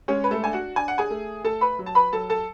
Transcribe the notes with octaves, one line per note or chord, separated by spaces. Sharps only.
G#3 C#4 C#5
B4
A3 A4
D4 G#5
F#4 F#5
D4 G#5
F#5
G#4 G#5
A3
A3 A4 A5
B4 B5
F#3
A5
B4 B5
F#3 A4 A5
A4 A5